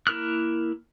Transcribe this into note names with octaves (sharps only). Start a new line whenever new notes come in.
A#3 E4 A#4 F6 F#6